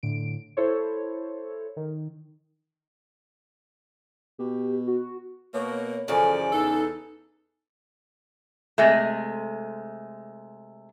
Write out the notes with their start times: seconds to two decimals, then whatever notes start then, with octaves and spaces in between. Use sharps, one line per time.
0.03 A2 D3 D7
0.57 E4 A4 C5 C#5
1.77 D#3
4.39 B2 G4
4.87 F#4
5.54 B2 A#3 C#5
6.08 F#2 C#3 E3 F3 C#4 A4 D5
6.53 E2 D#4 A4
8.78 C3 G#3 A3